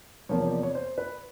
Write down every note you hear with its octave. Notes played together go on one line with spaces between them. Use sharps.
E2 C3 F3 A#3 C#5
C#5
D5
C#5
C5
B4